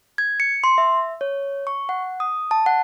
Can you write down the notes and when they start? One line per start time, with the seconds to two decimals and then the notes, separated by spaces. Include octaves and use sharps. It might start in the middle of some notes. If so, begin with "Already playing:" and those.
0.18 G#6
0.40 C#7
0.64 C6
0.78 E5
1.21 C#5
1.67 C#6
1.89 F#5
2.20 D#6
2.51 A5
2.66 F#5